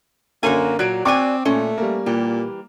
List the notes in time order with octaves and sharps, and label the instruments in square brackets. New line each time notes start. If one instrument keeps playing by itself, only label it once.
[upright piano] F#2 D3 [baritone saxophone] A#3 [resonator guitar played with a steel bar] F#4 C#5 G#5
[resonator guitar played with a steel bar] A#2 D5 [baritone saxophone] F#3 [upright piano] F#6 G#6 D7
[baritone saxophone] C4 [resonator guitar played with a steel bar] F#4 D5 G#5 [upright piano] G5 C#6 D6
[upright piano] A#2 [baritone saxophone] A3 [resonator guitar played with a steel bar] C#4
[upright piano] G3 A#3
[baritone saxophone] A#2 [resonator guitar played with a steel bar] E3 G4